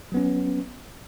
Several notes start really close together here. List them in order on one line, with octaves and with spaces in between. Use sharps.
F#3 B3 C#4